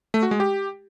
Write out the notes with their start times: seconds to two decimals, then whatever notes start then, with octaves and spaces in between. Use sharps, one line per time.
0.14 A3
0.23 F#4
0.31 G#3
0.40 G4